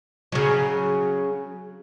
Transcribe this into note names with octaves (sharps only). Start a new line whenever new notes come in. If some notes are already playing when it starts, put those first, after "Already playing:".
C#3 F#3